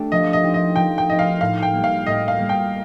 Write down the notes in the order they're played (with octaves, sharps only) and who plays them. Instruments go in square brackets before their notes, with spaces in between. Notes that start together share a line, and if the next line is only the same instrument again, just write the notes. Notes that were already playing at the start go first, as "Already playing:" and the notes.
Already playing: [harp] A3 D4 G4
[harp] F3 [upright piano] D#5
[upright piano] D#5
[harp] C4 D#4 G4
[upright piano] D#5
[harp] F3 [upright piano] G5
[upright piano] G5
[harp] C4 D#4 G4 [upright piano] D#5
[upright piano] F5
[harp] A2 [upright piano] F5
[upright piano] G5
[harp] G3 A#3
[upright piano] F5
[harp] A2 [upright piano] D#5
[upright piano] F5
[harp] G3 A#3
[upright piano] G5